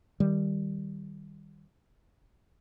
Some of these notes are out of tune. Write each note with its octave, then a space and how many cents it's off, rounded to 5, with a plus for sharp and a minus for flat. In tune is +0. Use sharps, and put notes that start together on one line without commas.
D#3 +0 G3 +0